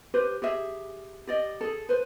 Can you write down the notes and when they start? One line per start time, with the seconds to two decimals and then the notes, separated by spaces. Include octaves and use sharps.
0.14 G4 B4 C5
0.42 G4 G#4 E5
1.27 G4 D5 D#5
1.61 G#4 A4
1.89 B4 C5